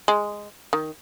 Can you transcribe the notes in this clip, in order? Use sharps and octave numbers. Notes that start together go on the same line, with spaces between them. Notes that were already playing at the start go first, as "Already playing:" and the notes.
G#3
D#3